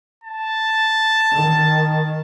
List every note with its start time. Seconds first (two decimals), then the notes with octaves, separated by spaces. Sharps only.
0.24 A5
1.32 D#3